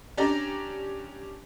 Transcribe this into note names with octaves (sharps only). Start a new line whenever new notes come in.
C#4 D4 G4 D5 A#5